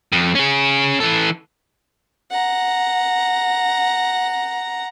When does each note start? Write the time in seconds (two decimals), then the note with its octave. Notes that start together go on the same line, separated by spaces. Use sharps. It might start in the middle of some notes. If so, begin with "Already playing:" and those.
0.12 F2
0.35 C#4 G#4
1.00 E3 A4
2.31 F#5 A#5